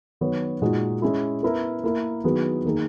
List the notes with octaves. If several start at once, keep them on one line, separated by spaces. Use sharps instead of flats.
D#3 F#3 B3 F#4 C#5
A#2 G#3 D#4 F#4
G#3 C#4 E4
B3 E4 A#4
A#3 E4 A#4
D#3 F#3 B3 E4 G#4
D#3 A#3 D#4 G#4